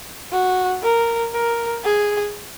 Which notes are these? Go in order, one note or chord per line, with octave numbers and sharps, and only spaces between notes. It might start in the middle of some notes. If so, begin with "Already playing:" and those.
F#4
A#4
A#4
G#4